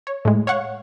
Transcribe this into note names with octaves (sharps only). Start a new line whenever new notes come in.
C#5
A2 G#3
C#5 F5 F#5 C#6